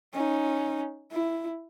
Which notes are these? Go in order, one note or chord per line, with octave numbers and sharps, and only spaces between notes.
C#4 D#4
E4